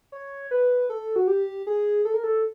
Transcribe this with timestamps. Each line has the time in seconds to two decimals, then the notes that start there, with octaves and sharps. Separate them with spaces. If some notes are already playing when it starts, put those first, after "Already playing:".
0.12 C#5
0.51 B4
0.89 A4
1.16 F#4
1.28 G4
1.67 G#4
2.05 A4
2.14 A#4
2.24 A4